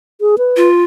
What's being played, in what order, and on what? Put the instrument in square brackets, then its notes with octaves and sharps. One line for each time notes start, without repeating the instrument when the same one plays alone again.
[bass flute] G#4
B4
[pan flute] F4